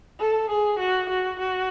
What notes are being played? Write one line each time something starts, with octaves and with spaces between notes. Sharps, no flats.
A4
G#4
F#4
F#4
F#4